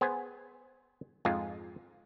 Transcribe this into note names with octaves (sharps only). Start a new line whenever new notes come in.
B3 G#4 C5 G#5
F2 G#2 G#3 F4